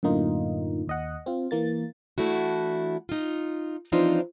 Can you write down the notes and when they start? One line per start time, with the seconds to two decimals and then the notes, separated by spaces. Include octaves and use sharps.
0.03 F#2 A2 D3 A#3 D#4 F4
0.87 D#2 D#5 F#5
1.26 C4 F4
1.51 E3 A#3 A6
2.18 E3 A3 D4 E4 F#4
3.09 D#4 F4
3.92 E3 F3 C4 D4 D#4 F4